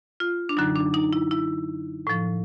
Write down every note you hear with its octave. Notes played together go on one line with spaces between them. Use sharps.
F4
D4
F#2 D3 F#3 D#4
D4
D#4
E4
E4
A2 F3